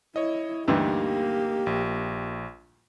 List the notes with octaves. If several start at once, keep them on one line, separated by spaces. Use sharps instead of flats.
E4 C#5 D#5
D2 G2 E3 A#3 D#4 G4
A#1